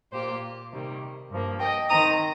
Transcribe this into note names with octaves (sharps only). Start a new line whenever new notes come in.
A#2 A#3 F4 G4 C5
C3 D#3 G3 A#3
G2 F3 A#3
D#5 G5
D#3 C4 D#4 A#5 D#6